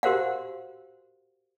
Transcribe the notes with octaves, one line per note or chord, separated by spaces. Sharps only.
F#4 G4 A#4 C5 F5 F#5